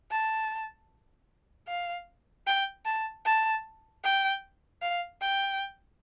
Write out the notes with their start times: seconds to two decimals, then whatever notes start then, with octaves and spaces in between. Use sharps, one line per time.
0.11 A5
1.68 F5
2.47 G5
2.86 A5
3.25 A5
4.04 G5
4.82 F5
5.21 G5